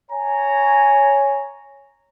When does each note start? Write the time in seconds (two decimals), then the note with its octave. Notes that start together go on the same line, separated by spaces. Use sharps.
0.11 C#5 G#5 A#5